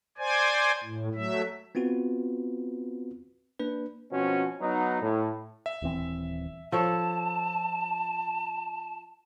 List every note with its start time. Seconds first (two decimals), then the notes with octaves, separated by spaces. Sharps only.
0.18 C5 D5 G#5
0.84 A2
1.15 F#3 A3 E5
1.75 B3 C4 F4 F#4 B4
3.59 A#3 D4 B4
4.12 B2 F3 C4 C#4 F#4
4.61 F#3 B3 D#4
5.01 A2
5.66 E5
5.82 D#1 E3 C4
6.72 F3 A4 C#5 A5